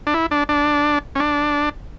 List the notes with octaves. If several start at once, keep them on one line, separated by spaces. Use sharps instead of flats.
D4
E4
D4
D4
C#4
D4